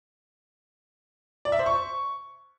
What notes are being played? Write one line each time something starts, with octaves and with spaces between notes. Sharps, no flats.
D5
E5
C5
C#6